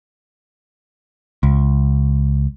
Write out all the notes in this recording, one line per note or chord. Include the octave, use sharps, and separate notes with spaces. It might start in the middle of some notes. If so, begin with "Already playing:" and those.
C#2